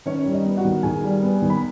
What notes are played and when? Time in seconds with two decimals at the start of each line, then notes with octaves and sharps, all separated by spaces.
0.06 D#3 C#4 C#5
0.26 G3
0.32 D#4 D#5
0.45 B3
0.57 F#4 F#5
0.65 D#3
0.83 D#3 G#4 G#5
1.04 G3
1.22 B3
1.42 D#3
1.50 B5